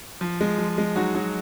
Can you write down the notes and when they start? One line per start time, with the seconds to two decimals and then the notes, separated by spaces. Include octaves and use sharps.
0.21 F3
0.41 G#3
0.58 F3
0.78 G#3
0.96 F#3 D#4 F#4
1.15 F#3 D#4 F#4